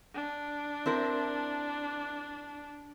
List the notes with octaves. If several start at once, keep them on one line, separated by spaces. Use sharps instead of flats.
D4
C4 E4 A#4